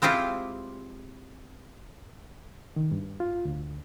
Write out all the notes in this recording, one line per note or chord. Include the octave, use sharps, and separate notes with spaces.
G#3 C4 E4 F4 G4
D#3
G2
F4
D2